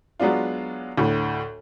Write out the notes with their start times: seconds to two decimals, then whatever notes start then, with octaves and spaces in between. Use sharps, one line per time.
0.20 F#3 G#3 B3 D4 F4
0.98 D2 A2